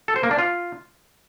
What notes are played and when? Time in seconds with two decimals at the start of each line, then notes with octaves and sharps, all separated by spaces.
0.08 A4
0.16 C5
0.23 A#3
0.31 D4
0.39 F4